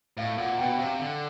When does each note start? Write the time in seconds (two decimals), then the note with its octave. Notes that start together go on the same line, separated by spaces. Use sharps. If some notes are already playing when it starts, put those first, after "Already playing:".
0.17 A2 F5
0.38 A#2 F#5
0.58 B2 G5
0.78 C3 F5
0.99 D3